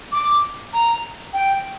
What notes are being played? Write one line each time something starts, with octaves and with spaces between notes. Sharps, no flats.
D6
A#5
G5